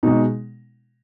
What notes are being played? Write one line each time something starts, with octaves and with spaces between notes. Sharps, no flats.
B2 G#3 D#4